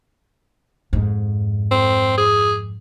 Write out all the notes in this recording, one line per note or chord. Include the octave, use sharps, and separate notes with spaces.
F2 G#2
C4
G#4